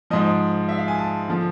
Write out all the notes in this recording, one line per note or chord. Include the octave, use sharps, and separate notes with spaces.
G#2 F3 D#5
E5
F5
G#5
A5
D3 F3